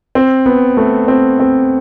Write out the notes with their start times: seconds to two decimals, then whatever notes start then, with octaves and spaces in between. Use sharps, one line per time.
0.15 C4
0.46 B3
0.77 A3
1.08 C4
1.40 C4